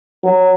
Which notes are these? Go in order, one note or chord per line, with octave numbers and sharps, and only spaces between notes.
F#3